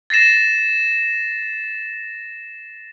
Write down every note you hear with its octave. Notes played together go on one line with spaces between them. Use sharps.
A6 A#6 C7 E7